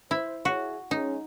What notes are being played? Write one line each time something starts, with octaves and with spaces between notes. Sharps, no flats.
E4 C5
E4 F#4 G#4 C#5
G#3 C#4 D#4